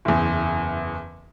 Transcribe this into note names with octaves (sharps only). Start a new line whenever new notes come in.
F#1 E2